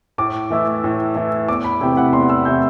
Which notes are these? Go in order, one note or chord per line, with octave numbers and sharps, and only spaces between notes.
A2 D6
E3 A3 E4
A2
E3 A3 E4
E2 D6
B5
C3 E3 A3 E4 G5
F#5
E2 C6
E6
C3 E3 A3 E4 G6